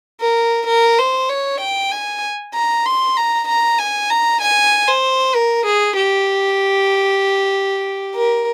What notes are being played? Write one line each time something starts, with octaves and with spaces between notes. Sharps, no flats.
A#4
A#4
C5
C#5
G5
G#5
A#5
C6
A#5
A#5
G#5
A#5
G#5
C5
A#4
G#4
G4
A#4